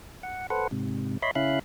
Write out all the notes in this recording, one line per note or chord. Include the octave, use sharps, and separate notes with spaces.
F#5
A4 B4 C5 F#5
G#2 C3
C#5 D#5 E5 B5 C6
C#3 C#4 E4 E5 F5 F#6